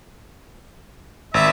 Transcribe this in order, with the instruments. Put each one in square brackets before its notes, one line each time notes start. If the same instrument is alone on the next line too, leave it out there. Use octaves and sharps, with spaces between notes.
[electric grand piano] G#1 [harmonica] E5